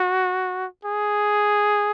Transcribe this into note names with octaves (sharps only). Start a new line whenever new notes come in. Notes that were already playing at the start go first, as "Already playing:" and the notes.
Already playing: F#4
G#4